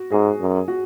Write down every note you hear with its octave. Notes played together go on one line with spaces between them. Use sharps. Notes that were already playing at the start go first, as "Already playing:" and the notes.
Already playing: F#4
G#2 G#4
F#2
F#4